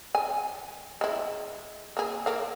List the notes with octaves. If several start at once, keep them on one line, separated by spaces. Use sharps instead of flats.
G#5
G#3 E4
A#3 G#4
A#3 A#4 F5